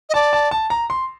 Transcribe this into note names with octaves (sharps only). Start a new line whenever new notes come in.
D#5
D5 A5
A5
A5
A#5
C6